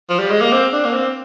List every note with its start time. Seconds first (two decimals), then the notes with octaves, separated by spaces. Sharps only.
0.09 F3
0.19 G3
0.30 G#3
0.41 A#3
0.52 C4
0.73 D4
0.85 A#3
0.94 C4